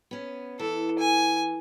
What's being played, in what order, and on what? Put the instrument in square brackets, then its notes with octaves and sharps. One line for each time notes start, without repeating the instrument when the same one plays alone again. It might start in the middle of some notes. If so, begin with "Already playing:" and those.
[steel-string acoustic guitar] B3 C#4
[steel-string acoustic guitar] E3 [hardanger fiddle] A4
[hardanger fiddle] G#5